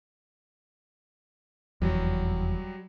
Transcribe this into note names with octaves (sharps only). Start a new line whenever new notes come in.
F1 E2 F#3 G3